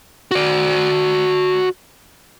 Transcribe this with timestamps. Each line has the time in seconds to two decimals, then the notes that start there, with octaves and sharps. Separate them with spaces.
0.31 F#4 D5